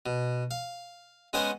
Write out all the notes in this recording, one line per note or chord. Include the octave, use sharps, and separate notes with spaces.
B2
F5
G#3 B3 C#4 G#4 C5 F#5